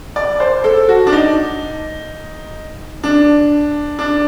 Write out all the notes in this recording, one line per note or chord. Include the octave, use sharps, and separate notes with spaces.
D5
C5
A4
F#4
D4
D#4
D4
D4